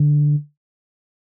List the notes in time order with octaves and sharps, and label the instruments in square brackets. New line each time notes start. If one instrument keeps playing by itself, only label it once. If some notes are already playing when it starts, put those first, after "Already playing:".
Already playing: [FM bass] D3